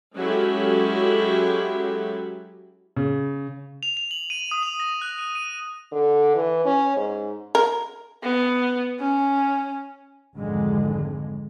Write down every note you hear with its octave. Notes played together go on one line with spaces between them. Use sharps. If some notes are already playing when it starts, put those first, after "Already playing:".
F#3 G#3 C#4 E4 G4 A4
C#3
F7
F7
F#7
D#7
D#6
F7
A#6
F#6
D#7
D#7
D3
E3
C#4
G#2
A#4
B3
C#4
G#1 F2 D3 G#3